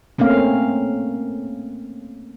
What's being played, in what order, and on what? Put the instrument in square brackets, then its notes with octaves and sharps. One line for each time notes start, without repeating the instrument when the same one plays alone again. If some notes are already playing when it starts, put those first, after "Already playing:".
[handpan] A3 A#3 C4 C#4 F5